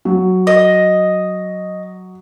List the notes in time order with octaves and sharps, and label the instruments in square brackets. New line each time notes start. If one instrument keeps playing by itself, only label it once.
[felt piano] F#3
[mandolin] D#5